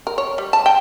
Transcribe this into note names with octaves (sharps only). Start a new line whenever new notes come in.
A#4
C#5
G3
A5
G5